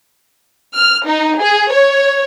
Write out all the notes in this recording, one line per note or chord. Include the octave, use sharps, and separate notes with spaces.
F6
D#4
G#4
C#5